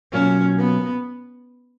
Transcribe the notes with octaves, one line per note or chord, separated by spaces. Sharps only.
B2 F#3 A#3 C#4 F4
B3